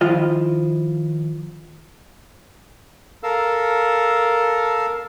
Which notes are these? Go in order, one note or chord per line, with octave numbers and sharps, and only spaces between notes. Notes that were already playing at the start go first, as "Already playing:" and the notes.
D#3 F3 E4 F4 D#5
A4 A#4 F5 E6